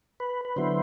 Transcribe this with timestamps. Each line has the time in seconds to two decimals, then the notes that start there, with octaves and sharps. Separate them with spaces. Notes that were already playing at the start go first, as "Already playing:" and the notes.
0.20 B4
0.45 B4
0.56 D3 F#3 B3 E4 C5